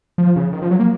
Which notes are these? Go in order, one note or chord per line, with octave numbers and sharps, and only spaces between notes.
F3
C#3
D#3
F3
F#3
A#3